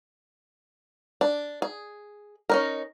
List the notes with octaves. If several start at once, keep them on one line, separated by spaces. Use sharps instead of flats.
D4
G#4
C#4 D#4 A#4